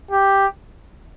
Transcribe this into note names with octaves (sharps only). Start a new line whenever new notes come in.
G4